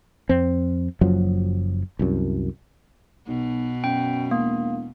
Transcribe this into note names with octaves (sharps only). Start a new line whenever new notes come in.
F2 C4
F#1 F#2 F3 F#3
C2 F#2
B1 B2
F#2 G5
E1 A#3